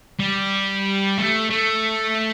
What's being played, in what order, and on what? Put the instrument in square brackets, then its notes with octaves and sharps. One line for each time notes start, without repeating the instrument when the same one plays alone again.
[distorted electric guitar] G3
A3
A3